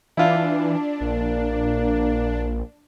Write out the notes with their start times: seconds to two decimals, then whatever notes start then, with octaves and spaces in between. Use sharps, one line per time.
0.17 E3 D4 E4 F4
1.01 A#1 A#3